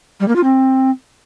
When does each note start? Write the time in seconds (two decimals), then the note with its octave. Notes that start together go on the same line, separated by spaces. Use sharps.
0.20 G3
0.28 A#3
0.36 F4
0.44 C4